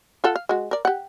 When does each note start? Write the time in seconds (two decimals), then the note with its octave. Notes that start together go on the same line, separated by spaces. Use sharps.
0.24 F4 A4 F#5
0.36 F5
0.49 G#3 F#4
0.71 A#4 D5
0.85 G4 F#5